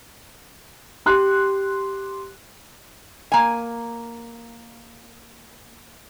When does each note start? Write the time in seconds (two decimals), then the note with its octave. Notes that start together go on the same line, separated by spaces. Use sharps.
1.06 G4 C6 F#6
3.32 A#3 G#5